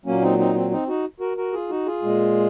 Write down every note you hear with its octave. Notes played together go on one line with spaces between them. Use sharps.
A#2 F#3 A#3 C#4
C4 D#4
C4 D#4
C4
C4 D#4
D#4 F#4
F#4 A#4
F#4 A#4
F4 G#4
D#4 F#4
F4 G#4
A#2 G#3